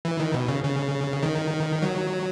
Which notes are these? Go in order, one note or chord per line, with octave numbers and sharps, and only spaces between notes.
E3
D#3
B2
C#3
C#3
D#3
F#3